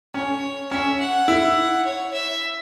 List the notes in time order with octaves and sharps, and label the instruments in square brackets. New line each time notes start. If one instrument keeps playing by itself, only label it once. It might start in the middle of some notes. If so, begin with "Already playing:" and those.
[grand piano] C#4 [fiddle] C#5
[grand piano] C#4 [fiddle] E5
[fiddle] F#5
[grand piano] E4
[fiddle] C#5
E5